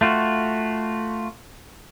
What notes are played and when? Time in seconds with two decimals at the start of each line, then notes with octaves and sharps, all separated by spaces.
0.01 A3 F4 F#4